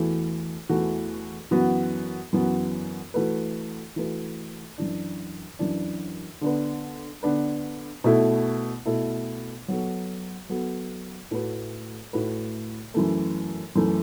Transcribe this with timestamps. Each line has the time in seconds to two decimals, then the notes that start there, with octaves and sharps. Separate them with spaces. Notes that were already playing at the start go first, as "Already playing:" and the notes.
Already playing: E2 E3 A3 F#4
0.69 E2 E3 A3 F#4
1.51 F#2 E3 B3 F#4
2.33 F#2 E3 B3 F#4
3.14 E3 A3 F#4 B4
3.96 E3 A3 F#4 B4
4.78 F#2 E3 D4
5.59 F#2 E3 D4
6.41 D3 B3 D4 B4
7.23 D3 B3 D4 B4
8.04 B2 A3 E4 A4
8.86 B2 A3 E4 A4
9.68 F#3 B3 F#4 A4
10.49 F#3 B3 F#4 A4
11.31 A2 A3 F#4 B4
12.13 A2 A3 F#4 B4
12.94 F#2 E3 A3
13.76 F#2 E3 A3